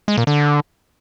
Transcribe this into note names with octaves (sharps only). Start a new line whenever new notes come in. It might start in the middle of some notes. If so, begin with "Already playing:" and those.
G#3
A#2
D3